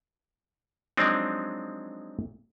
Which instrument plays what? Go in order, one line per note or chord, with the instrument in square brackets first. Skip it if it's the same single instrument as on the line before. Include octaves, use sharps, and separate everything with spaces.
[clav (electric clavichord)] F3 F#3 G#3 C4 D4 D#4